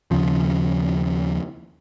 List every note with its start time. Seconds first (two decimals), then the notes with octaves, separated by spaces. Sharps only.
0.11 D#2 C#3 F3